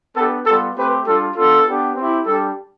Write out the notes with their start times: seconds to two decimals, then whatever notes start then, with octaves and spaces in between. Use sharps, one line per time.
0.16 B3 D4 G4 A4
0.46 G3 B3 F4 A4
0.76 A3 C4 G4 B4
1.06 G3 D4 F4 A4
1.36 B3 D4 F4 A4
1.67 B3 D4 G4
1.96 C4 E4 G4
2.26 G3 D4 G4 A4